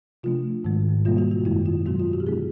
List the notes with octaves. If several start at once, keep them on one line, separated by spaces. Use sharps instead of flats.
C3 F3 A3 D4 F4
G#2 D#3 G#3
B2 G3 A#3 F4
F#4
F#4
F#2 D#3 G#3 E4
F4
B2 F#3 B3 F#4
F4
F#4
G4
D3 F3 G#3 B3 D#4 G#4